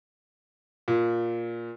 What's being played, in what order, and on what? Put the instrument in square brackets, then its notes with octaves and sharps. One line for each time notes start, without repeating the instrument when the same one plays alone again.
[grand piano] A#2